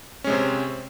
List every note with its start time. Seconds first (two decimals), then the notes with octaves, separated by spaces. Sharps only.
0.24 C#4
0.27 G#3
0.30 C3
0.32 C4